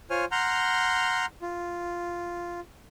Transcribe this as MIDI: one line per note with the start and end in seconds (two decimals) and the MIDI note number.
0.10 0.25 65
0.10 0.25 72
0.10 0.25 73
0.10 0.25 80
0.10 0.25 89
0.31 1.26 78
0.31 1.26 82
0.31 1.26 84
0.31 1.26 89
0.31 1.26 91
1.42 2.60 65